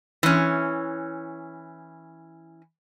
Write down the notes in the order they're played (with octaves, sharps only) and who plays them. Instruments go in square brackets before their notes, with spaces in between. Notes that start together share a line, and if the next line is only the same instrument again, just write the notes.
[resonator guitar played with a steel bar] E3 C#4